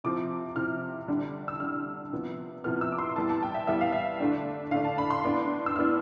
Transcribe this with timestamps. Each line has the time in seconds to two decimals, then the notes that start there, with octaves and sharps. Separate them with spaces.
0.04 C3 F3 C4 D6
0.56 C3 F3 C4 F6
1.08 D3 G3 D4
1.48 E6
1.60 D3 G3 D4 F6
2.13 C3 F3 B3
2.64 C3 F3 B3 F6
2.81 E6
2.92 D6
2.98 C6
3.16 E3 G3 B3 A5
3.29 A5
3.43 G5
3.55 E5
3.67 E3 G3 B3 E5
3.81 F5
3.93 E5
4.20 D3 A3 D4
4.71 D3 A3 D4 F5
4.84 A5
4.98 B5
5.10 C6
5.24 A2 E3 B3 D4
5.66 E6
5.75 A2 E3 B3 D4 F6